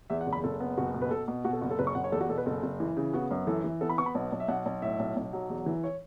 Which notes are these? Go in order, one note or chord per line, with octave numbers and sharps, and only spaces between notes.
E2 E5
F#5
F#1
B5
F#1 A4
B3
F#1 F#4
B2
B4
B2 A4
B2
B2 F#4
A4
F#1 F#4
A4
F#1 B4
C#6
F#1 F#5
C#5
E2 A4
F#4
B2 A4
B4
F#1 A4
F#1
E3
C#3
B3 F#4
F#2
E3 A4
E3
B3 A4
B5
B3 C#6
B5
B1
B1
E5
B1 F#5
B1
A2 E5
B1
B1
F#3
E2
E3
C#5